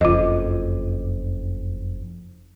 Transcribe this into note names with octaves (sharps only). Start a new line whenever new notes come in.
F#1 F2 F4 D#5